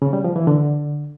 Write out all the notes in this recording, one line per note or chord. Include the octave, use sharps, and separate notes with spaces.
C#3
G3
F3
E3
D3